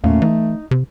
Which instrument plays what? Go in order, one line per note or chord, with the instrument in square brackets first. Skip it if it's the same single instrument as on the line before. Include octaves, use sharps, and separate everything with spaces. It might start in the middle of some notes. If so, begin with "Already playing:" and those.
[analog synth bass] E2 [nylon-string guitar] A#2 C#4 F5 [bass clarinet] A3
[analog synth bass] E3 [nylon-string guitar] D#4
[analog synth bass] C3